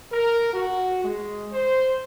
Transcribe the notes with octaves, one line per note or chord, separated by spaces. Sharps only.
A#4
F#4
G#3
C5